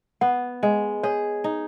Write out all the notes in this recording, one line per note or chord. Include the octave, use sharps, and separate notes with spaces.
B3 F#5
G#3 D#5
G#4 C#5
D#4